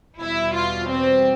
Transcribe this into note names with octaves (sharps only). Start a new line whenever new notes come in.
E2 B2 G3 E4
F4
C4